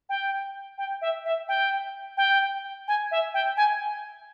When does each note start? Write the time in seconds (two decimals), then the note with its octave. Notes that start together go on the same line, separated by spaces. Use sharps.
0.09 G5
0.78 G5
1.02 E5
1.25 E5
1.48 G5
2.17 G5
2.88 G#5
3.11 E5
3.34 G5
3.57 G#5